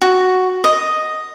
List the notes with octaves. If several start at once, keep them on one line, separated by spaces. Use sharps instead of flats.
F#4
D#5